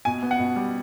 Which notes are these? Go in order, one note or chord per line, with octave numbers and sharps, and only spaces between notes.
B2 G#5
B3
F#5
B2
G3